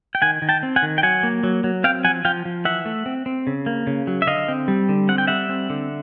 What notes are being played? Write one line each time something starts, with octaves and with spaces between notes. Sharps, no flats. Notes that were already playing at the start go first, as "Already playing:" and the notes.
G5
D#3 F#5 G#5
D#3
G5 A5
C4
F#5 G#5
D#3
G5
F#3 F#5 G#5
A#3
F#3
F#3
C4 F5 G5
F3 F#5 G#5
F3 F5 G5
F3
E3 E5 F#5
A3
C4
C4
C#3
A#3
C#3
F#3
E5
D3 D#5 F5
C4
G3
D3
C4 F#5
G5
G3 E5 F#5
C4
D3